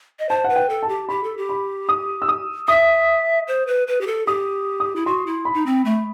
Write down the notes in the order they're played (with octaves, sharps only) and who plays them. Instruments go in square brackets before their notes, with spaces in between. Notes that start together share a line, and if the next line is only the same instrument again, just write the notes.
[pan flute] D#5
[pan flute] C5 [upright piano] A5
[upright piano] F#5
[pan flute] B4
[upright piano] G5
[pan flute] A4
[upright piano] A5
[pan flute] G4
[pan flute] G4 [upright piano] B5
[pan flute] A4
G4
[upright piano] B5
D#6
E6
D#6
[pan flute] E5 [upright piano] D#6
[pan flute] C5
B4
B4
G4
A4
[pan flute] G4 [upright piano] D#6
[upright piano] D#6
[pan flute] E4
[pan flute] F#4 [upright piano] C6
[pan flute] E4
[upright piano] B5
[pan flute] D#4
C4
A3